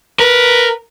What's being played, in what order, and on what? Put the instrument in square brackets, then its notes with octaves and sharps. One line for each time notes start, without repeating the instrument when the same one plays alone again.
[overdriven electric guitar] A#4 [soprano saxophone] B4